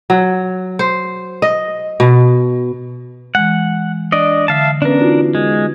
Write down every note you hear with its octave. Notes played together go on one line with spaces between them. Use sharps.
F#3
C5
D#5
B2
E3 G#3 F#5
D4 D5 D#5
D3 E5 F5 A5
B3 C#4 D4 A#4 B4
D#4 F4 F#4
G#3